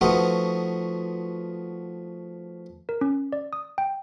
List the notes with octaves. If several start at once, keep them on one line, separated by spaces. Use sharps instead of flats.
F3 A3 B3 D#4 F4 F#4
A#4
C#4
D5
D#6
G5